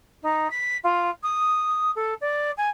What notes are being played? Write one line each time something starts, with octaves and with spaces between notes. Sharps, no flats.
D#4
B6
F4
D#6
A4
D5
G#5